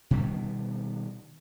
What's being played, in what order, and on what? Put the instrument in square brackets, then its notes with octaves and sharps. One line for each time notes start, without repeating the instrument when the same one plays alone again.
[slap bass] B2 D#3 G3 B3